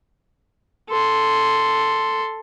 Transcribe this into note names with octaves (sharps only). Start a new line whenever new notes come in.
A4 C6